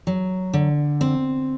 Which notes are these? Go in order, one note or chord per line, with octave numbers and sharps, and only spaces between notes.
F#3
D3
C4